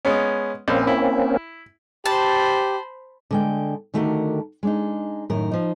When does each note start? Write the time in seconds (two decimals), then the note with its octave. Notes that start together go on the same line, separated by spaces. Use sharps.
0.05 G#3 B3 C#4
0.68 A#1 A#3 C4 C#4
0.87 E4
2.06 G4 C5 A5 B5
3.31 D3 G#3 G5
3.94 D3 D#3 A3 F#4 G4 A#4
4.63 G#3 D4 D#4
5.30 F#2 A2 D#3 A#4
5.51 F3 D#4